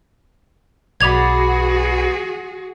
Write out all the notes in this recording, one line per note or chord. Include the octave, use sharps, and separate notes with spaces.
B1 B3 F#4 G#4 D5 B5 G#6 F7